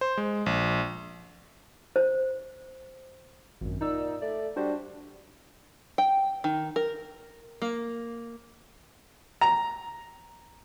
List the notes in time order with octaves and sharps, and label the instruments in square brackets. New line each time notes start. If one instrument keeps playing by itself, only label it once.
[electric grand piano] C5
G#3
A#1
[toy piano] C5
[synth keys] G#1 F#2
[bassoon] A#2 [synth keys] D#4 D5 E6
[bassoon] A3 [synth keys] D5
[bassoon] G3 [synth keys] D4 F#4 C5
[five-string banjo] G5
D#3
A#4
A#3
[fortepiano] A#5